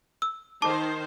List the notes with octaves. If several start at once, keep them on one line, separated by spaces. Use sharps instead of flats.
E6
D#3 C5 A5 D6